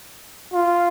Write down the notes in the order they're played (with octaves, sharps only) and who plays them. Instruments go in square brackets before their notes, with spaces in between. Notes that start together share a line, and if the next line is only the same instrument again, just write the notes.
[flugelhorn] F4